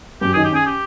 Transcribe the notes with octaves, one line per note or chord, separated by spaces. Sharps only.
F#2 G4
D#3 G#4
G4
C#4 G#4
G4